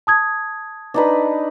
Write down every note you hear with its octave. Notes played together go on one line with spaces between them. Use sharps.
A5 D#6 G#6
D4 D#4 B4